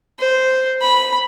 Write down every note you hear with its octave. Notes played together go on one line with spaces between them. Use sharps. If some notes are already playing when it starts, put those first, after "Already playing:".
C5
B5